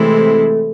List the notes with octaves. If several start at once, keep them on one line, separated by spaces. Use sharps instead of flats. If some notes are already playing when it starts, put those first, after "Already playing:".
Already playing: C3 E3 G#3 A3 C4 E4